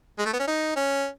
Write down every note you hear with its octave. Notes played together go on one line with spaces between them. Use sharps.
G#3
A3
B3
C#4
D#4
C#4